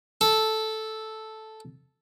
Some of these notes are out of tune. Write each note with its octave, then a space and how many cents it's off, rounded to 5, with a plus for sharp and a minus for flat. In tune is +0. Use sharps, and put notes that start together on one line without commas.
A4 -5